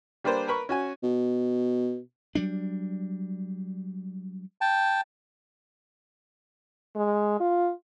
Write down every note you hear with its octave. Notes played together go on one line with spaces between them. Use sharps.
G3 A#3 D4 B4 C5
A#4 B4 B5 C#6
C#4 F#4 G#5
B2
F#3 G3 D4
G5 A5
G#3
F4